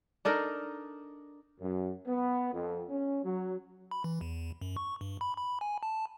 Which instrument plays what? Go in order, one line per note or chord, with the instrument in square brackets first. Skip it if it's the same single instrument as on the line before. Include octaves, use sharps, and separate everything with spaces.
[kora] D4 D#4 A4 A#4
[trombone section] F#2
B3
F2
C#4
F#3
[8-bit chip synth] B5
E3
E2
F#2
C#6
G2
B5
B5
G#5
A5